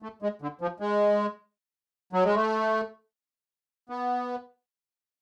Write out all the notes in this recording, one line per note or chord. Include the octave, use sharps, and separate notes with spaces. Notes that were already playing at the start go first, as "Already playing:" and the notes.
A3
G#3
D3
F3
G#3
F#3
G#3
A3
B3